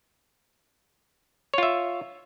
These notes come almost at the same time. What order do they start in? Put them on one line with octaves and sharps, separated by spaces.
C#5 F4 E5